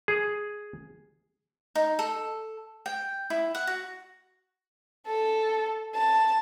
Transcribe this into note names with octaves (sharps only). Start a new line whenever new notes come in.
G#4
D#4
A4
G5
E4
F#5
F#4
A4
A5